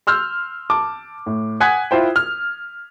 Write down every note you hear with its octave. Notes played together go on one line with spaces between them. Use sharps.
C6 E6 F6 G6
A5 D6
A2
F#5 G#5 D#6 F#6 G#6 B6
E4 F4 C5 G5
F6